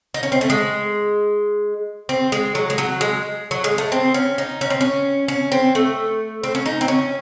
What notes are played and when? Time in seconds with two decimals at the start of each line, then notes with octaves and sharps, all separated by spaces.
0.14 D#4
0.23 C#4
0.32 C4
0.41 A3
0.50 G#3
2.09 C4
2.32 G#3
2.55 F#3
2.70 G#3
2.78 F#3
3.01 G#3
3.51 F#3
3.64 G#3
3.78 A3
3.92 C4
4.14 C#4
4.38 D#4
4.61 C#4
4.70 C4
4.81 C#4
5.28 C#4
5.52 C4
5.75 A3
6.44 C4
6.55 C#4
6.66 D#4
6.81 C4
6.88 C#4